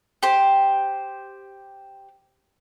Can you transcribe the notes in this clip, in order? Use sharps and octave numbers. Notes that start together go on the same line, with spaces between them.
G4 C5